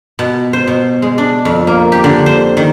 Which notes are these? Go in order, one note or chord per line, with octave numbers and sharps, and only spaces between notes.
B2
C5
B2
G#3
D4
F2
A#3
G4
D3
C5
D#3